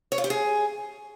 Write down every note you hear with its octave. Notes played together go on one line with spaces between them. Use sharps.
C#5
F4
G4
G#4